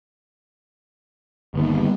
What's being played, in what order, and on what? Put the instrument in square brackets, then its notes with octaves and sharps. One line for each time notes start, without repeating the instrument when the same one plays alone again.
[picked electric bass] G1 D#2 [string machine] G3 B3